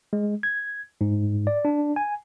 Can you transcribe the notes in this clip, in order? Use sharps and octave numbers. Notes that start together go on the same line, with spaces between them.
G#3
G#6
G#2
D5
D4
G#5